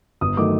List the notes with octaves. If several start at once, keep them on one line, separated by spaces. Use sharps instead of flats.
G1 D#6
D#3 F#3 A3 D6